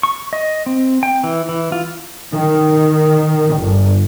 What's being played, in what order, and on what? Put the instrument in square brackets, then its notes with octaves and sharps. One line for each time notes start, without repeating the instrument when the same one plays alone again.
[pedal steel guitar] C#6
D#5
C4
G5
E3
E3
F4
[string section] D#3
G1